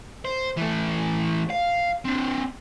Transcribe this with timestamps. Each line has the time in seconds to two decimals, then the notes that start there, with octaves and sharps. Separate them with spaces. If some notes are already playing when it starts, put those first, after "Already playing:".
0.25 C5
0.57 E3 A3
1.50 F5
2.05 C4 D4